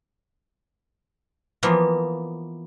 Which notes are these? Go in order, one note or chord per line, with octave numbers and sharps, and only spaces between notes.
E3 F3 A#3 B3